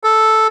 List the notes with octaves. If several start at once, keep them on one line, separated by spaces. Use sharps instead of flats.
A4